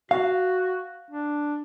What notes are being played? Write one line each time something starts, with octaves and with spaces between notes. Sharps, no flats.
F#4 F5
D4